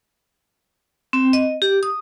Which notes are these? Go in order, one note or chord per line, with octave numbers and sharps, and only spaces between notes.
C4
D#5
G4
D#6